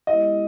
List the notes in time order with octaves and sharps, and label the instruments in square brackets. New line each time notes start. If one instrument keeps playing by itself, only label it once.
[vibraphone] G#3 B3 E4 G4 [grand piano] D#5